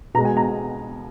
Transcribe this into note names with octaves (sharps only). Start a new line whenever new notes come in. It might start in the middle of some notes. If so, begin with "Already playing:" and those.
B2 G#3 A#5
G#5
A#5